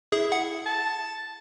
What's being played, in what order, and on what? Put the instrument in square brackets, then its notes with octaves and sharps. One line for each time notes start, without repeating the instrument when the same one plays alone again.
[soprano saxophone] E4 [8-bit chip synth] G#4
[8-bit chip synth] F#5
[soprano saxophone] A5